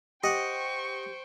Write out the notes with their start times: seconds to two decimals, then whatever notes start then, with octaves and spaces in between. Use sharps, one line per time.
0.24 G4 C5 D#5 F#5 G5 C#6